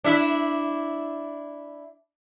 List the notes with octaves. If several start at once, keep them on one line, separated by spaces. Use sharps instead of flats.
D4 E4 E5